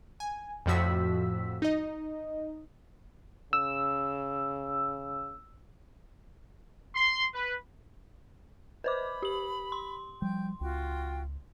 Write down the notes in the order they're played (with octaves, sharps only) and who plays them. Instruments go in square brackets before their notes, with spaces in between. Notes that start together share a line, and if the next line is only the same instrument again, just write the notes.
[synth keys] G#5
F2 A2 F3 F#4 E6 B6
D#4 D#5
[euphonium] C#3 [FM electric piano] E6
[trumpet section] C6
B4
[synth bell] B4 C5 D6 [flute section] B5
[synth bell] G4 F#7
C6
[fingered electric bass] F3 G3 [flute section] G5 G6
[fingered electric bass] C#2 [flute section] F4 F#4 G5